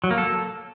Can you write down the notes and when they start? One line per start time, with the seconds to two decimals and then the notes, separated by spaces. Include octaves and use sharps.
0.04 F#3
0.11 A#3
0.18 A4